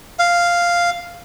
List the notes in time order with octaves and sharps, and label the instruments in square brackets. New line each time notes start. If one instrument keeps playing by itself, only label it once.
[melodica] F5